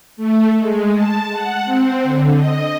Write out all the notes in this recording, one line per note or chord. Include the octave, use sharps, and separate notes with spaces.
A3
G#3
A5
F#5
C4
D3
D#5